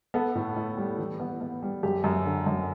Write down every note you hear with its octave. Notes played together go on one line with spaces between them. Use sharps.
B3 A4
A2
A2
G3
E3
B3
B3
G3
F#2 G4
F#2
D3
F#2